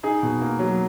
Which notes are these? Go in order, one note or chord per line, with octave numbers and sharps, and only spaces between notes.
D#4 G#4
B2
A#3
F#3